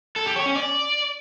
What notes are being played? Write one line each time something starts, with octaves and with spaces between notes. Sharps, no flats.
A4
G4
C#5
C#4
D5